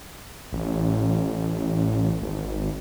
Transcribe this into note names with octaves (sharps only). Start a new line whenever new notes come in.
A1
G#1